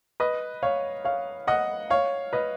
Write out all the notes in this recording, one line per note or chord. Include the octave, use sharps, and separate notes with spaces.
B4 D#5
C#5 F5
C#5 F5
D#5 F#5
C#5 F5
B4 D#5